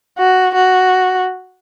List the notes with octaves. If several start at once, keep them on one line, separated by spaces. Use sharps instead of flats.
F#4
F#4